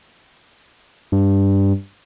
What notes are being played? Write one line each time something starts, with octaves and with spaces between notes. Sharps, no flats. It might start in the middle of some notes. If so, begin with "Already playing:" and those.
G2